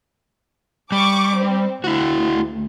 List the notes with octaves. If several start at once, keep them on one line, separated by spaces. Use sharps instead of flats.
G3 C#6 D6
C4
D2 E4 F#4